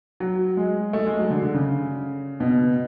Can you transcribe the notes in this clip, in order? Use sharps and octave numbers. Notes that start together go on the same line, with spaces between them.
F#3
G#3
A3
G#3
F#3
D3
D3
C#3
B2